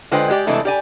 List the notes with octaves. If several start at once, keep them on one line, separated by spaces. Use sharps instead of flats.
D3 G#3 F4 B4 C5 G5
G#3 G4 D5
C3 E3 G#3 A3 D4
G4 D5 G#5